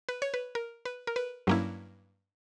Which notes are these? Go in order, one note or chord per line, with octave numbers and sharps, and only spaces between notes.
B4
C#5
B4
A#4
B4
A#4
B4
G2 F#3 A#3 C#4 E4